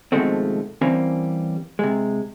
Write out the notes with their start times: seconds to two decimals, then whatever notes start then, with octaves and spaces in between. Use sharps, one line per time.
0.12 B2 D#3 F3 G#3 A3 C4
0.81 E3 G3 A#3 C4 C#4
1.79 C3 G#3